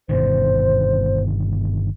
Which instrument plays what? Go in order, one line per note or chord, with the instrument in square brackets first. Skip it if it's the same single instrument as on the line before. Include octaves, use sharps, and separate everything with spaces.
[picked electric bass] G1 B2 D#3 [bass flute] C5